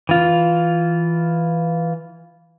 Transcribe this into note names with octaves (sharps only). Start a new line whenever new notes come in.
E3 F4